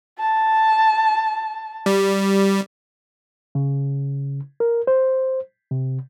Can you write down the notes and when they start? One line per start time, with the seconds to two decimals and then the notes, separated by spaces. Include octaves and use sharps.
0.19 A5
1.86 G3
3.55 C#3
4.60 A#4
4.87 C5
5.71 C3